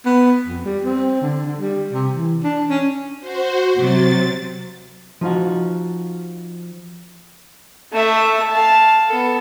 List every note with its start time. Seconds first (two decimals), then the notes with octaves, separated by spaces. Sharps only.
0.06 B3
0.47 F2
0.65 G3
0.85 C4
1.22 D3
1.46 D3
1.59 G3
1.93 C3
2.16 E3
2.43 D4
2.70 C#4
3.20 F#4 C5
3.77 C3 F#3 A6
5.21 F3 D#4 F4 F#4
7.93 A3 E5
8.51 F5 A5
9.07 B3 A4